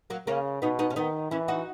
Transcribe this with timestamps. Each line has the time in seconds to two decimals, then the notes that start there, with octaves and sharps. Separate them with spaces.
0.10 F#3 A#3
0.27 C#3 A#3 C#4
0.62 B2 B3 D#4
0.79 B3 D#4
0.90 C#4
0.96 D#3 B3 D#4
1.31 E3 C#4 E4
1.48 D#4 F#4